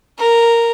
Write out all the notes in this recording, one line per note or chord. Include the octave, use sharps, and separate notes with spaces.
A#4